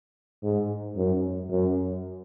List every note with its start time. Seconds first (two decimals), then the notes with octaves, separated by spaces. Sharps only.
0.43 G#2
0.96 F#2
1.50 F#2